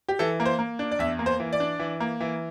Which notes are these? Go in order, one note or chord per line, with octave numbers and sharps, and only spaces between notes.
G4
E3 A4
A#3
C5
A#3
D4
D5
E2 E5
A#3
C5
E3
D5
D4
E3
A#3
E3